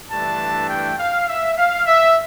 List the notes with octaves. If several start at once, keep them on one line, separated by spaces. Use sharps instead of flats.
G2 E3 A3 D4 A5
G5
F5
E5
F5
E5